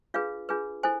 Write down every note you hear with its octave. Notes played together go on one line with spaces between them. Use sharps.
D4 F4 G#4 B4 F5
D4 F4 G#4 B4
E4 A4 C5 G#5